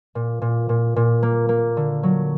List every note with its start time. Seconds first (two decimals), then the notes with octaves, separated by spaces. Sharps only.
0.15 A#2
0.42 A#2
0.69 A#2
0.96 A#2
1.23 A#3
1.49 A#3
1.77 D3
2.03 F#3